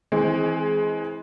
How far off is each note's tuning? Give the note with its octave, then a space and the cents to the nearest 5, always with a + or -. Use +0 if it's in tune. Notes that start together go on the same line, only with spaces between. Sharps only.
E3 -20 G#3 +15 C4 +0